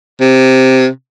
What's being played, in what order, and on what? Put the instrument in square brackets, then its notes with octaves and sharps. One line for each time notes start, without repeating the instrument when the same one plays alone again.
[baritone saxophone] C3